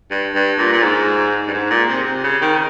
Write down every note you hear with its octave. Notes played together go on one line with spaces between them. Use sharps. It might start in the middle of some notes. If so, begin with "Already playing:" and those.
G2
G2
A#2
A#2
G#2
G2
G#2
A#2
C3
C3
C#3
D#3